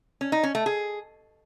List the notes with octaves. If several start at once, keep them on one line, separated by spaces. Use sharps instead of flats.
C#4
D#4
C#4
A3
G#4